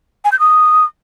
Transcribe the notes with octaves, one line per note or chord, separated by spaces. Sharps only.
G#5
G6
D#6